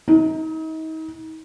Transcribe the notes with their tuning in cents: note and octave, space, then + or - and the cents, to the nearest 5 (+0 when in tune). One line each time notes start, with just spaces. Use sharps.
D#4 +40